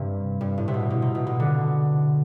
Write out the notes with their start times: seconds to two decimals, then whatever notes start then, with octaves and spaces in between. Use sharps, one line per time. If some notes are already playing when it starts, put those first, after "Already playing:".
Already playing: G2 C3
0.41 G2
0.58 A2
0.68 C3
0.74 B2
0.90 B2
1.02 C3
1.15 B2
1.27 B2
1.40 D3